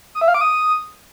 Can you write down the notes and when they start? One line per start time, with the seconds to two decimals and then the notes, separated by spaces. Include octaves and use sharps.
0.15 D#6
0.21 E5
0.28 F5
0.34 D6
0.41 D#6